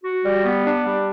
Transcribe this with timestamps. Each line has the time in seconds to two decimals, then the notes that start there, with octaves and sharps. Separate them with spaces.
0.04 F#4
0.24 G3
0.45 B3
0.65 D4
0.85 G3